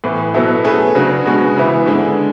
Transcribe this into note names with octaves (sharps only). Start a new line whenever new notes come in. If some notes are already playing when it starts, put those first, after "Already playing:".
A2 E3 B3
B2 F#3 B3 E4 A4
A3 C#4 G#4 B4
C#3 F#3 B3 D4 F#4
B2 G#3 B3 F#4 B4
C#3 E3 B3 E4
D3 G#3 D4